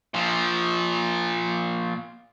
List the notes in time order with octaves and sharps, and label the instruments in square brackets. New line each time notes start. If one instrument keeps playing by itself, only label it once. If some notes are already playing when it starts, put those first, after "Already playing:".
[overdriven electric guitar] A#2 F3